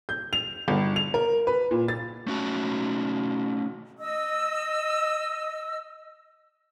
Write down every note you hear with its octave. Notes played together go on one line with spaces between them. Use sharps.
G6
F7
G1
F7
A#4
B4
A#2
A6
A3 C#4 F#4 A5
D#5 E6